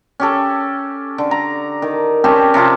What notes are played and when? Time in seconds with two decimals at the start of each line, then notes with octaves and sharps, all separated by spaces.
0.20 C#4 G4 A4
1.18 D3
1.31 A#5
1.82 D#3
2.24 C4 C#4 G4 A5
2.54 C3 F3 C4 F4